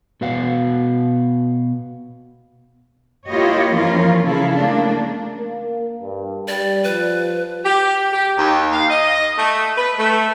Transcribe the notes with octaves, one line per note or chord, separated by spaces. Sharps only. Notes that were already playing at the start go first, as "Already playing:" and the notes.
B2 F#4 B4 F5 F#5
A#3 E4 F4 G4 C#5 D#5
E3 F3 A#3 C#4 F4 A#4
C#3 E4 A4 F5
A3 A#3 D4
A#3
G2
G3 D5
F3 B4
G4
G4
D#2
F5
D#5
A3
B4
A3